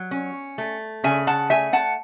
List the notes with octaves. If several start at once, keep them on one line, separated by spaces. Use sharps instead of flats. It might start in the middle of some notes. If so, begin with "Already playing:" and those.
Already playing: F#3
C#4
A3
C#3 E5 G#5
F#5 A5
A3 E5 G#5
F#5 A5